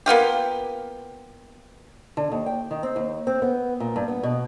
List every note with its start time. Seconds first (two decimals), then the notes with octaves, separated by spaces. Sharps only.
0.06 A#3 B3 F4 G4
2.17 D3
2.32 D#2
2.46 G5
2.71 D#3
2.83 C4
2.96 D#2
3.27 C4
3.42 B3
3.80 A#2
3.96 G2
4.08 B3
4.23 B2